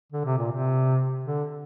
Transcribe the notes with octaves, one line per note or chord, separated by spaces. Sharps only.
D3
C3
A#2
C3
D3